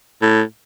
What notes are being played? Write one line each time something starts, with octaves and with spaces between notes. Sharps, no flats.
A2